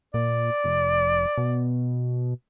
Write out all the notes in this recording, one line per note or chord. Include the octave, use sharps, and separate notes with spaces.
A#2 D5
F1
B2